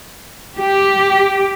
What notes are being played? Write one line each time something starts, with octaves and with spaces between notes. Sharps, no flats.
G4